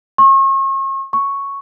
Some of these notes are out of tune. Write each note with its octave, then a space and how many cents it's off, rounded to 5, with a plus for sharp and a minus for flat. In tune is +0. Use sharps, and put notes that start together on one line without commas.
C#6 -40
C#6 +0